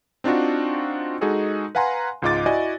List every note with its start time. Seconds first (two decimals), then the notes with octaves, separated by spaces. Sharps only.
0.24 C4 D4 D#4 F4 F#4
1.21 G#3 D#4 F#4 G#4 A4
1.75 B4 F5 F#5 G#5 A#5 C6
2.22 C#2 G#2 F4 D#5 D6 A6
2.46 E4 F#4 D5 D#5 G#5